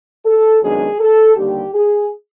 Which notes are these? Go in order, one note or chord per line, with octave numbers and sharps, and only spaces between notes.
A4
F#2 D#3 G#3 B3 D4 G#4
A4
D#2 D3 G3 A#3 G4
G#4